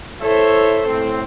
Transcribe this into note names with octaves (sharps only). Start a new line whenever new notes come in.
E4 A4 C5 C#5 E5
A2 C4